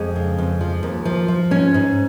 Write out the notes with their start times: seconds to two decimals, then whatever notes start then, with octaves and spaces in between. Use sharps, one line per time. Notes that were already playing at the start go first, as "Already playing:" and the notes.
Already playing: F2 G#3
0.16 C#3
0.38 F2
0.61 F3
0.83 D#2
1.05 F3
1.28 F3
1.51 G#2 C#4
1.74 G#2